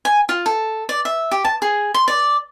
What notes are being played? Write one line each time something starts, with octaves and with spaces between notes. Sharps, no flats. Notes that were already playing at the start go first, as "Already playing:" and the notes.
G#5
F4
A4
D5
E5
G4
A5
G#4
C6
D5